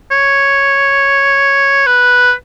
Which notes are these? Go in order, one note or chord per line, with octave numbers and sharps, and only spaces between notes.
C#5
B4